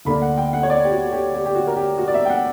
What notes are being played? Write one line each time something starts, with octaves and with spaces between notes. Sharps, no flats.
D2 D3 A#3 D4 B5
F#5
G5
F#5
C#5
D5
G4
F#4
G4
G4
G4
F#4
A#4
G4
F#4
D5
E5
G5
F#5